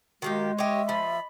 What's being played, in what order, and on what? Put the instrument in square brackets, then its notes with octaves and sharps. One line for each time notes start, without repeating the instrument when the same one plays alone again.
[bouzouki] D#3 A#3 G4 [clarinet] G#3 [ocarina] F#4
[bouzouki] G4 C#5 [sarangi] D#5 [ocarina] E5
[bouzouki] F3 [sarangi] B5